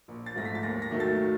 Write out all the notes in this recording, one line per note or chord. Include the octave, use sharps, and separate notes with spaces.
A#1
A6
G#2 F3 A3 A#6
B6
A6
D#2 A#6
A#6
D#3 F#3 A3
A6